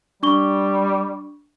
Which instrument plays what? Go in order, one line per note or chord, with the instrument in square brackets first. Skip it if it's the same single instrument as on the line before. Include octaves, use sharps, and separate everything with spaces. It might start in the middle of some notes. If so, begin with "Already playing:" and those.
[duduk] G3 [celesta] D4 C#6 G7